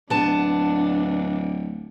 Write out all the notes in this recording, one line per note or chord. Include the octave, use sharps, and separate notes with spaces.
D1 B3 D4 A5